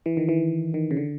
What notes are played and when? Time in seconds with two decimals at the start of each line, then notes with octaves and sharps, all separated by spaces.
0.06 E3
0.17 D#3
0.29 E3
0.74 D#3
0.91 C#3
0.97 D3